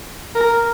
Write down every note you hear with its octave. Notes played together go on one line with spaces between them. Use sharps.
A#4